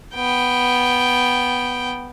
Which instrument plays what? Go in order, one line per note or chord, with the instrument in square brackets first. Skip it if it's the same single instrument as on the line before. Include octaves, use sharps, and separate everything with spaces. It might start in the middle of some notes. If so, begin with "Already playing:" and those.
[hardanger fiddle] B3 G5